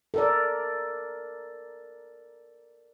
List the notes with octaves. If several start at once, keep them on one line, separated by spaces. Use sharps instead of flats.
A4 A#4 D5